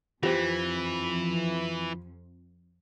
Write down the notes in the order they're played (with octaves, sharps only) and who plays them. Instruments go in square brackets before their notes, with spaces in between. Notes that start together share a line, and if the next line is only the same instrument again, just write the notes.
[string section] F2 [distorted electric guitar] E3 [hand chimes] F4 [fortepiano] G4 C5